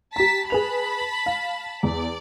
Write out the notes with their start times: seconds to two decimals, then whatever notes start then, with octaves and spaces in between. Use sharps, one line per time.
0.16 G4 A5 A#5 B6
0.50 G#4 B4 A5 B5 F7
1.26 F5
1.83 E2 D5